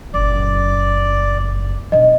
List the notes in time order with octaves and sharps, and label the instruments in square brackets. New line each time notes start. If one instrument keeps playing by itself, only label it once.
[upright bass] F#1 A#2 [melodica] D5
[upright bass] B2 D4 [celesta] D#5